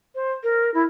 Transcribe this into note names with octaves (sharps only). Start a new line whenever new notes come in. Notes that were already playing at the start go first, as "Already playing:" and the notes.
C5
A#4
E4